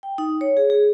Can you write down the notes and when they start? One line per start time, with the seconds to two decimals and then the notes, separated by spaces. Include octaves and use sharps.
0.03 G5
0.18 D#4
0.41 C#5
0.57 G#4
0.70 G#4